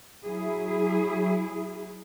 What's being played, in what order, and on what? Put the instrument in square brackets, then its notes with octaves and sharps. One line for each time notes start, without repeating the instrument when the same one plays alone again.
[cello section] F#3 E4 G#4